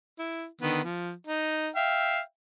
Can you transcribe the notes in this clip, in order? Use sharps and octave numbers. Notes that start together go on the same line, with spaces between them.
E4
D3 D#3 B3
F3
D#4
E5 F5 G5